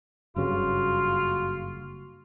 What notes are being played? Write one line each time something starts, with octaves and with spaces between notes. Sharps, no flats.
F#1 G2 C#3 F4 F#4